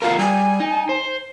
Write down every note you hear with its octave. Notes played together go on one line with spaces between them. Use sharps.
F4 F#4 A#4 F5
G3 G#5
D#4
C5